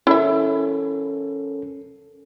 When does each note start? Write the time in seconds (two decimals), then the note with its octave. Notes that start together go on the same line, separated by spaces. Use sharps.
0.07 C#4 E4 A4 A#4 E5